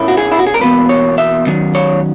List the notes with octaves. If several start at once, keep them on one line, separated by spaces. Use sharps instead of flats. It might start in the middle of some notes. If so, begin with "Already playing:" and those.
Already playing: A#2 A#3 C#4 E4
F#4
G#4
E4
F#4
G#4
A#4
E2 B2 A#3 B4
C#5
E5
D#3 F#3 C#4
C#5